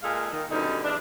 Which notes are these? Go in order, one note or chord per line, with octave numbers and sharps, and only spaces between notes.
A#2 G#3 G#4 A4 F5
D#3
F#2 B2 D3 G3 D#4
E2 D4